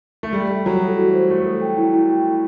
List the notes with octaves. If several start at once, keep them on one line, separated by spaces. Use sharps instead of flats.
A3
G3 A4
E5
F#3 A4
A4
E3 F#4
C5
A3 F#4
A4
G5
E4
E4
G5
E4